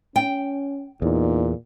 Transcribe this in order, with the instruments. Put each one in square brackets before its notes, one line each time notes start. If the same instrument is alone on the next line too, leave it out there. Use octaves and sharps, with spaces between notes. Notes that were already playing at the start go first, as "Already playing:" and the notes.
[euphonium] C#4 [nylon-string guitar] G5
[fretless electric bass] E2 [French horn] A#2 [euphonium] D#4